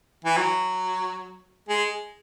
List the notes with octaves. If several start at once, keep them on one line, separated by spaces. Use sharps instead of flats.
E3
F#3
G#3